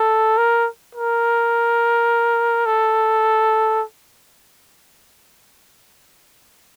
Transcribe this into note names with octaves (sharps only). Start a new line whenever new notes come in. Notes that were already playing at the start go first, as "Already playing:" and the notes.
Already playing: A4
A#4
A#4
A4